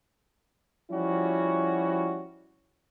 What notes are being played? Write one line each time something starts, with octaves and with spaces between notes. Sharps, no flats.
F3 G3 C#4 E4 F#4